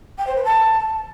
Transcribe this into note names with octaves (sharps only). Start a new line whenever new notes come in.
G5
C5
B4
A5